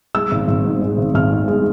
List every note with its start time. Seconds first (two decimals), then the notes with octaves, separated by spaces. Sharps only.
0.15 G#3 E6
0.31 G#1
0.48 G#1
0.65 G#2
0.82 G#3
0.98 G#1
1.14 G#1 F6
1.32 G#2
1.48 G#3